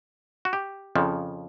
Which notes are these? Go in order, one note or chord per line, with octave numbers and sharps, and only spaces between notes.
F#4
G4
F2 C#3 F3